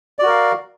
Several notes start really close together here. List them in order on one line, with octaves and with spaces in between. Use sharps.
D5 F#4 A#4 F5